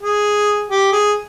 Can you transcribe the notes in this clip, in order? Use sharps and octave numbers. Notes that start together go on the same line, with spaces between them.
G#4
G4
G#4